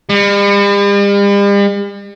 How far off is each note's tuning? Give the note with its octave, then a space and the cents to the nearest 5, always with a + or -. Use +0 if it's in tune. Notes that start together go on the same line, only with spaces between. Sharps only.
G3 +45